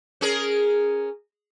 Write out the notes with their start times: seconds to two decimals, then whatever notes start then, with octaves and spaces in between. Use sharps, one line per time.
0.21 C#4 G#4 A#4